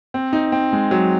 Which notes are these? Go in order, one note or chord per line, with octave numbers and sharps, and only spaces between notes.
C4
D#4
C4
G#3
F#3